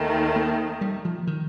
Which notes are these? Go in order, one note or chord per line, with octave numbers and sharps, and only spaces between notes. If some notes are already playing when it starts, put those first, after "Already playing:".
Already playing: D#2 D#3 A3
A#3
G3
F3
D#3